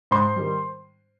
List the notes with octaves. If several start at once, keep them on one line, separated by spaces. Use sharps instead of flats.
G#2 C5 C6
D#3 G3